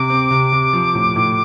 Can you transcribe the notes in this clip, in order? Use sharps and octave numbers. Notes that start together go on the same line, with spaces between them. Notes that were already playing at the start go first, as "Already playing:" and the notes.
Already playing: C3 D6
C4
C3
C3
F3
A2
A2